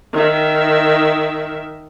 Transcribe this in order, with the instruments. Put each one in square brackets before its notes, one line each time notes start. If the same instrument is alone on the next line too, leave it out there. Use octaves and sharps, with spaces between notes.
[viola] D#3 E5